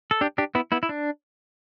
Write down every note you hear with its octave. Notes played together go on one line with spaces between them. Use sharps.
A4
D4 G4
D4 G4
B3 E4
B3 E4
E4
D4